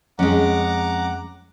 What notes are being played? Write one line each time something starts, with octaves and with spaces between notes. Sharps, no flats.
F2 G#3 C#4 F#5 A#5 D6